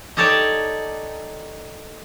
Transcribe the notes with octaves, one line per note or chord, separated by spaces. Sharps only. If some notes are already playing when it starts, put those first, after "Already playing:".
D#4 G4 A4 C#5 D5 A5